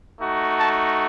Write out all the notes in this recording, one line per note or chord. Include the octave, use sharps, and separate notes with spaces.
A3 D#4 F#4
A5